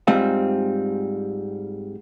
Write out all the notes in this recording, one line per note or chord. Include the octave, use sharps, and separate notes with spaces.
G#2 G3 C4 F4